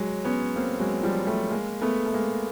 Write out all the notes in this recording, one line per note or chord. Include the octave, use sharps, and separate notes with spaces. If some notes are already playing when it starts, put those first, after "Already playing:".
Already playing: F#3 G#3
B3 C#4
A#3 C4
F#3 G#3
F3 G3
G3 A3
G#3 A#3
A3 B3
A3
G#3 A#3